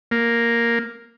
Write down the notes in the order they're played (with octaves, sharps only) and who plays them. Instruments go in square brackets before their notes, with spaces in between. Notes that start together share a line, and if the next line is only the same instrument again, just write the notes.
[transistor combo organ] A#3